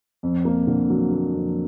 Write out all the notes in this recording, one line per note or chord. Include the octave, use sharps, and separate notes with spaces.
F2
A#3
D3
F#3
A#3
F2